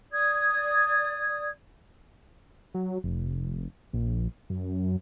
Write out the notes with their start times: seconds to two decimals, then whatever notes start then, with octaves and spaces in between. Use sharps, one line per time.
0.12 D5 D#6 G#6
2.74 F#3
3.04 F1
3.93 A#1
4.50 F#2